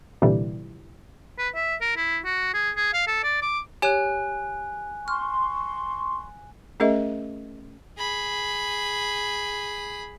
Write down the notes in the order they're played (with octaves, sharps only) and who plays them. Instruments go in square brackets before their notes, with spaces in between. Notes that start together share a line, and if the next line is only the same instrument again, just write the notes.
[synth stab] C2 A#2 D3 E3 G3
[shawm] B4
E5
A#4
E4
F#4
G#4
G#4
F5
A4
D5
D6
[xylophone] G4 C#5 E7 [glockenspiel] G#5 F#6
[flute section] C6 C#6 [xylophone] F6
[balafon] A3 C#4 G#4 A#4 D#5 E5
[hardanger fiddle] G#4 B5